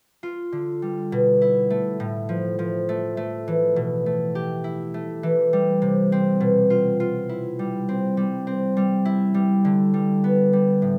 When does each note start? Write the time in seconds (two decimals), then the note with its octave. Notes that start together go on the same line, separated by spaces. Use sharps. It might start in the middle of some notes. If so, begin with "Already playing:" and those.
0.23 F4
0.52 D3
0.82 G3
1.12 B2
1.41 E4
1.70 A3
2.00 A2
2.29 F3
2.59 F3
2.89 A3
3.17 A3
3.48 E3
3.76 B2
4.06 A3
4.35 G4
4.64 E4
4.94 A3
5.23 E3
5.53 G3
5.82 C3
6.12 C4
6.40 B2
6.70 F4
7.00 F4
7.29 E4
7.59 G3
7.89 C4
8.17 G3
8.47 C4
8.77 G3
9.05 E4
9.34 G3
9.65 D3
9.94 G3
10.24 B3
10.53 G3
10.82 A2